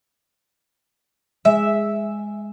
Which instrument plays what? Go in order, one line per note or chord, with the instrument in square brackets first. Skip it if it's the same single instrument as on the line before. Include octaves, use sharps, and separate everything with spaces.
[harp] G#3 B6 [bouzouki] E5